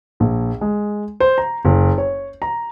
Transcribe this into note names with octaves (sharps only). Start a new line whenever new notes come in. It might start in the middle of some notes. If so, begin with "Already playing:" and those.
A#1
G#3
C5
A#5
F#1
C#5
A#5